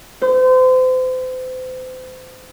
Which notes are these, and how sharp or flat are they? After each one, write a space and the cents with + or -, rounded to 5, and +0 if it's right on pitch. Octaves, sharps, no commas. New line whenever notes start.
C5 -35